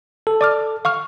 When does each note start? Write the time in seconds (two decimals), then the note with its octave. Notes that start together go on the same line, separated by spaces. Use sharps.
0.27 A4
0.41 D5 D6 F6
0.85 F5 C#6 F6